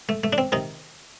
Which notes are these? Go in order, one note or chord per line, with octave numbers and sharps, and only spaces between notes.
A3
A3
D4
C4
C3 D#3 D#4